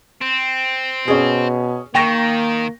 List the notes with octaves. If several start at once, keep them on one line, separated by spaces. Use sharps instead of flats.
C4
B2 C#4 G#4
D#3 A#3 G5 C#6 A#6